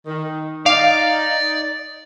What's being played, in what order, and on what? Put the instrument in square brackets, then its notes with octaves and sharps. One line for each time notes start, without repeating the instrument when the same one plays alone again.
[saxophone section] D#3
[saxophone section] D#4 [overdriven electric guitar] D5 [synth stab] F5